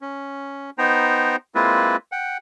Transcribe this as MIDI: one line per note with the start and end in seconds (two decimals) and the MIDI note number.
0.01 0.70 61
0.78 1.36 59
0.78 1.36 63
0.78 1.36 72
0.78 1.36 79
0.78 1.36 82
1.55 1.96 56
1.55 1.96 58
1.55 1.96 60
1.55 1.96 64
1.55 1.96 65
1.55 1.96 71
2.12 2.37 78
2.12 2.37 79